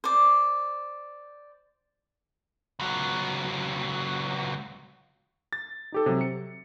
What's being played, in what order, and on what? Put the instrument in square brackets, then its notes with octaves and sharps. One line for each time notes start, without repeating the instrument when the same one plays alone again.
[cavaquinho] C5 D5
[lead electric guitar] C#2 F#3
[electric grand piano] A6
D#4 G4 A4
C3 F#3
C#7